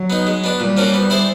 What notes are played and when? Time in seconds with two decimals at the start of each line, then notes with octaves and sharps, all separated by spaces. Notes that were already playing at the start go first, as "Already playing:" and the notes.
Already playing: F#3
0.10 B3 D#4
0.27 G#3
0.44 B3 D4
0.60 A#2 G3
0.77 F3 A#3 C#4 F#4
0.94 B3
1.10 E4 G#4 C5